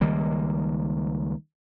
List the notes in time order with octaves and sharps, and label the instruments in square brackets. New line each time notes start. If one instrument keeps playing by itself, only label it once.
[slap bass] C#2 D#3 G3 A#3